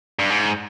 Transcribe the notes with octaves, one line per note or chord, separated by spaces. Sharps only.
G2
G#2